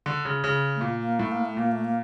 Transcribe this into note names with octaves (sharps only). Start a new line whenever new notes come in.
D3
C#3
C#3
A3
A#2 A#3
A#3
A2 A3
A#3
A3
A#2 A#3
A3
A#3